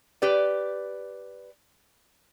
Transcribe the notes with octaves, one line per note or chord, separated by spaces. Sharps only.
G4 B4 D5